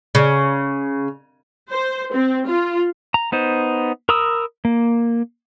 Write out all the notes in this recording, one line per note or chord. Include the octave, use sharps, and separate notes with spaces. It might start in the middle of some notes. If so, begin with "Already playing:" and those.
C#3
C5
C4
F4
A#5
B3 D#4 C5
A#4 A#5 B5 D#6 E6
A#3